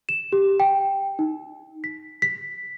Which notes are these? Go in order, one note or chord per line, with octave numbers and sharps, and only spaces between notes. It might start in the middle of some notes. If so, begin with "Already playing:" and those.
E7
G4
G5
D#4
B6
B6